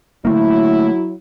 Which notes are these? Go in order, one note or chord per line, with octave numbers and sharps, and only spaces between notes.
D3 F#3 A3 A#3 E4